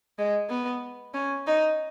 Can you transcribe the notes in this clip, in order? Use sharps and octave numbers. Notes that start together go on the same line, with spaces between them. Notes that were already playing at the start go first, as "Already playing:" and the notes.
G#3
B3
C#4
D#4